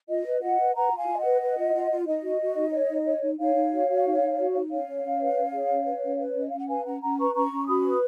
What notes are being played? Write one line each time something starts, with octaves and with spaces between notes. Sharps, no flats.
F4 D#5
B4
F4 D#5 F#5
B4
B4 F#5 A#5
F4
F5 G#5
F4
D#5 F#5
B4
B4
F4
F4
F4
D#4 D#5
F#4
F#4
D#4
C#5
D#4
C#5
D#4
D#4 C#5 F5
D#4
F#4
F#4
D#4
D#4
F#4
D#4
C#4 C#5 F5
C#4
C#4
B4
C#4
G#4
C#4
B4
C#4
B4
C#4 D#5
C#4 F5
F#5
B4 F5 G#5
C#4 F#5 A#5
C#4 F#5 A#5
B4 A#5 C#6
C#4 A#5 C#6
C#4
F#4 B5 D#6
B4